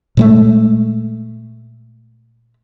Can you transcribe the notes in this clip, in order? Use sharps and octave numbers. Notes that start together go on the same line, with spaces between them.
A#2 G#3 A3